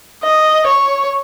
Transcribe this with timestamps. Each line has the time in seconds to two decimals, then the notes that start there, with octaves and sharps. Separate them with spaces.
0.23 D#5
0.67 C#5